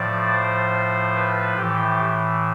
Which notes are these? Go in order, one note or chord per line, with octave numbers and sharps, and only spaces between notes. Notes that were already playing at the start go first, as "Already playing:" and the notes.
Already playing: A2 F3 D5
C5
B4
A2 E3 G4